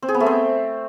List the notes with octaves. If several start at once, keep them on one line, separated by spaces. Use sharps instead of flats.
C4
G#4
B3
A3
C4